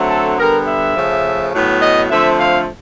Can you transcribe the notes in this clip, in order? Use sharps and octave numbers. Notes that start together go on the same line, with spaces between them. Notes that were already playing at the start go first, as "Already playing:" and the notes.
Already playing: D3 F#3 A3 C4
A4
D3 G3 B3 A#4
E5
C#3 F3 A3
A2 F#3 B3
D#5
D3 F3 A3 C4 E5
F5